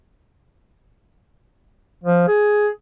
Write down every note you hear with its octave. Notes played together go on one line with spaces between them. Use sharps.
F3
G#4